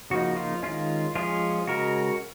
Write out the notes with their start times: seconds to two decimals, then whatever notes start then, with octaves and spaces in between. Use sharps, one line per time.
0.10 C#3 F3 A#3 D#4 F#4
0.37 F4
0.63 D#3 G#3 C#4 F4
1.15 F3 G#3 C#4 F4 G#4
1.67 C#3 G#3 C#4 F#4 A#4